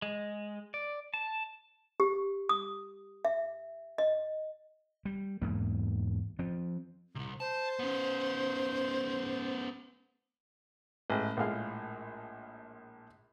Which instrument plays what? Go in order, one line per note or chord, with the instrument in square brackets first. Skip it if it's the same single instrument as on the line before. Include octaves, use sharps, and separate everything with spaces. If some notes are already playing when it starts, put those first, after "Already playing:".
[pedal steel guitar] G#3
D5
A5
[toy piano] G4
D#6
E5
D#5
[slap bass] G3
E2 G#2 A#3
F3 C4
[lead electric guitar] C2 C3
[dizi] C5 [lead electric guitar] A5
[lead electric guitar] B3 C#4
[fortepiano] A1 G#3
A#1 A2 G#3 F5